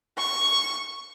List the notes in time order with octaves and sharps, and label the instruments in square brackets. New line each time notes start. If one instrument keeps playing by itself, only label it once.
[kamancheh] C#6